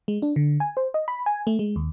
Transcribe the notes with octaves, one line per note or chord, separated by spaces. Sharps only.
G#3
D4
D3
G#5
C5
D#5
B5
G#5
A3
G#3
D#2